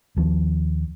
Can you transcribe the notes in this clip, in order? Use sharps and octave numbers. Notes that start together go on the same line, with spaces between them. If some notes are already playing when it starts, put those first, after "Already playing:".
D#2 F3